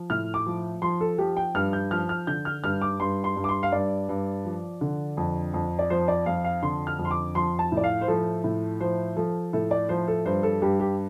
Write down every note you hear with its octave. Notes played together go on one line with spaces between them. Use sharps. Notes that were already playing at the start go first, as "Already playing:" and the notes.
Already playing: F3
A2 F6
D6
F3
F3 C6
A4
F3 G4
G5
G2 F6
G6
F3 F6
F6
D3 G6
F6
G2 F6
D6
G2 C6
C6
G2
D6
C6
F5
G2 D5
G2
F3
D3
F2
F2
D5
F3 C5
D5
F2 F5
F5
D3 C6
F6
F2
C6
D6
F3 C6
A5
A2
D5
F5
C5
F3 A4
A2
F3 C5
F3 A4
A2 A4
D5
F3 C5
A4
G2 C5
A4
G2 G4
G4